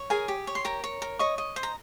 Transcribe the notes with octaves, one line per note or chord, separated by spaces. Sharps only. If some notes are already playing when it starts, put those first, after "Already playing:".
Already playing: C#5
G#4 A#4 G#5
G4
C#5
C6
G4 A#4 A#5
C#5
A#4
C#5 D#5 C#6
D#5
C5
A#5